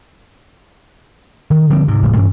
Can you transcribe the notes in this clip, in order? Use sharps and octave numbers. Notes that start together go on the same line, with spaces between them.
D#3
D3 F3 G3 C4
G#2 C3
F#1 A2 C3 E3
G2 E3 C#4